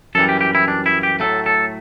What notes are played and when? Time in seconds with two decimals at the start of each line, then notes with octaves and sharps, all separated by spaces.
0.15 F#2 E3 G3 A4
0.29 G4
0.41 G4
0.55 E4
0.68 D4
0.86 E4
1.03 G4
1.20 A2 F#3 A3 A4
1.46 A4